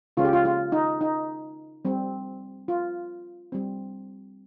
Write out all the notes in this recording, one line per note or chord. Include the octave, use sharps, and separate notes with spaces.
C#3 G#3 C#4 F4
G4
F4
F4
D#4
D#4
G3 C4
F4
G3 C4